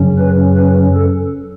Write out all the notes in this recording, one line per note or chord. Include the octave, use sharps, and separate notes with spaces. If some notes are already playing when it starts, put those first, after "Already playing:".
Already playing: F#2 C#3 F#3 C#4
B4
B4
A4